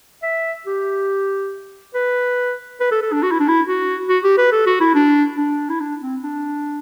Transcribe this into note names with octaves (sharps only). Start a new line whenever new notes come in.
E5
G4
B4
B4
A4
A4
D4
F#4
E4
D4
E4
F#4
F#4
G4
B4
A4
F#4
E4
D4
D4
E4
D4
C4
D4